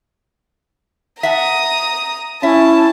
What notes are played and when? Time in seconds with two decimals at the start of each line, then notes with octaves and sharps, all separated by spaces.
1.23 E5 F#5 A5 A#5 D#6
2.43 C#4 E4 E5 A5